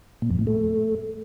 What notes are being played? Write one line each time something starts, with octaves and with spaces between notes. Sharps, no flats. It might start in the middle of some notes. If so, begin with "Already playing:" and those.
A#2
F2
A2
A3